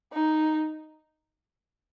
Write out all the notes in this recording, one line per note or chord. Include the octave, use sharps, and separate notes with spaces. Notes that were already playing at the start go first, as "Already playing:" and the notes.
D#4